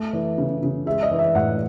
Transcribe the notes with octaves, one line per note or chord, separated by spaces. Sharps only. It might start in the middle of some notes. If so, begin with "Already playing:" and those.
Already playing: A3
E3
C#3
C#3
G#3 E5
D#5
E3
E5
A2 F#5